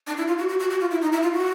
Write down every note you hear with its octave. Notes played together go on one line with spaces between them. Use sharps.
D4
E4
F4
F#4
F#4
F#4
F#4
F4
E4
D#4
E4
F4
F#4